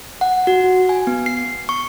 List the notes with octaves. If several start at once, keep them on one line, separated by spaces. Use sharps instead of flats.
F#5
F#4
G#5
B3
C7
C#6